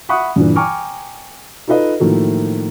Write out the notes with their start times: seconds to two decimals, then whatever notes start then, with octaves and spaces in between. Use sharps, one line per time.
0.09 E5 F#5 B5 C#6 D#6 F#6
0.36 G2 A#2 D3 E3
0.56 G5 G#5 A#5 C#6 D6 F6
1.67 D#4 F4 A4 B4 D#5
2.00 A2 D#3 F3 F#3 A3 A#3